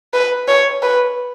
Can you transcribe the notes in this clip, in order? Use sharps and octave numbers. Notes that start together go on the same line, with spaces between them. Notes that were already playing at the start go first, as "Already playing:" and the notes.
B4
C#5
B4